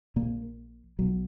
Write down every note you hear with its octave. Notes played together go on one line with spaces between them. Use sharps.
A#1 A#2 A#3
B1 B2 F#3